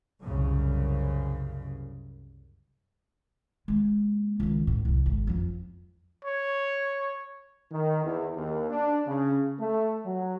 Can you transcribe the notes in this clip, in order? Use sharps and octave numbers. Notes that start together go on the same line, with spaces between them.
C2 F#2 C#3
G#3 A#3
C#2 D#3
A1 A2
C2 F2
G#1 E2
F2 F3
C#5
D#3
E2
D#2
D4
C#3
A3
F#3